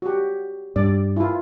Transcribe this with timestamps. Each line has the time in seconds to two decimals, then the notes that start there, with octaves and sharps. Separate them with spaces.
0.02 F#4 G4
0.76 G2 D5
1.16 E4 F4